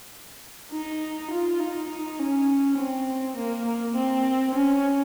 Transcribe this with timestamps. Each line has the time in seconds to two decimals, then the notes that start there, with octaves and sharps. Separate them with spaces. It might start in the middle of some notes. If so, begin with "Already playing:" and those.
0.72 D#4
1.31 F4
1.60 D#4
1.90 D#4
2.19 C#4
2.78 C4
3.37 A#3
3.66 A#3
3.96 C4
4.54 C#4